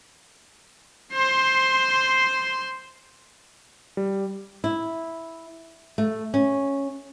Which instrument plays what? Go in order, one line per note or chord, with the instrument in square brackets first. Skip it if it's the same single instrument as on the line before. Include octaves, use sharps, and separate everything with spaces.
[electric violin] C5 C6
[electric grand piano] G3
[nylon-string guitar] E4
A3
C#4